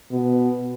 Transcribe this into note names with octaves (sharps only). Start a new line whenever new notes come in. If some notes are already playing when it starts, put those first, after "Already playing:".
B2